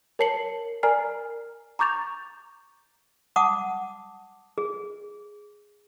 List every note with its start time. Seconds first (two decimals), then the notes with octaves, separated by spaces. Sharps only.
0.19 A#4 C#5 A5 C7 C#7 F#7
0.83 A#4 D5 G#5 A#5 F6 C7
1.79 A#5 C#6 D6 G6 A6 F7
3.36 F#5 A5 D6 D#6
4.58 G#4